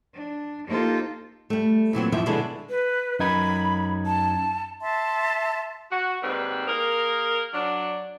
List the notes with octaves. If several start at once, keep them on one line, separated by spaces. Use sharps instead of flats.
D4
A#3 D#4 F4 G4 A4 C5
G3 A3
A#2 E3 F#3 C4
F#2 E3 F3 B3 E5
B2 D3 G#3 D4 E4
B4
F#2 D#4 B5 G#6
A5
E5 A5 C6
F#4
D#2 G#2 G3 C4 B4
A#3 G#4 A#4
F#3 D4